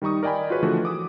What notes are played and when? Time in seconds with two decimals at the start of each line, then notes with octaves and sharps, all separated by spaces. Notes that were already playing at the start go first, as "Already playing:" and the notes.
0.02 D#3 G3 D#4 C#6 D#6
0.23 A#4 D5 D#5 G5 G#5 B5
0.50 F4 F#4 G#4 B4 C#5
0.62 D3 E3 F3 A3 F#4 A4
0.85 D6 D#6